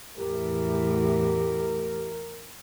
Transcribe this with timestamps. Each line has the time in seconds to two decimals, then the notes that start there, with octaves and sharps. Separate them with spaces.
0.17 E2 A2 E3 G4 A#4